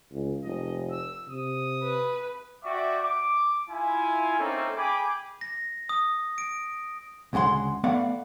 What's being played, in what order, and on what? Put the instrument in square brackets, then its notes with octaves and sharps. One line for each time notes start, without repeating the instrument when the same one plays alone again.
[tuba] C#2
[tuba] F1 [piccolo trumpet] D#5
[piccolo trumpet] E6
[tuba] C3 [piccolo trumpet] D#6
[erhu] B4
[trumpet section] F#4 D5 E5 G5 C#6 D6
D6
E4 F4 G#5
A#3 C4 C#4 D#4 A4 E5
G#4 G5 B5 D6
[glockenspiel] A#6
D#6
D7
[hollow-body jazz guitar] D2 C#3 G#3 F#5 C6
A3 B3 D5 F5 F#5